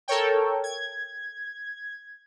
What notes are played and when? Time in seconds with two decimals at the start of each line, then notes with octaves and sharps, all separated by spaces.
0.08 A4 A#4 C#5 G5
0.64 G#6